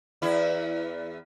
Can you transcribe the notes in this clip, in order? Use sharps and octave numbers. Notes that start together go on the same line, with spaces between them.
E2 E4